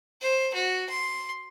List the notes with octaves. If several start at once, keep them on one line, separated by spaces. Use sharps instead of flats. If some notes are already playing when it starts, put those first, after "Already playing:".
C5
F#4
C6